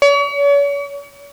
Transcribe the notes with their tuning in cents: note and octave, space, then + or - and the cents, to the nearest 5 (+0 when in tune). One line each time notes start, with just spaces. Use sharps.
C#5 +40